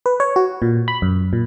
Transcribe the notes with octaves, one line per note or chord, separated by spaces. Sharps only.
B4
C#5
F#4
A#2
B5
F#2
A#2